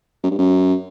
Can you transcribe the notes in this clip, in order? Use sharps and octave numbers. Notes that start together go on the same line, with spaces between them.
F#2
G2
F#2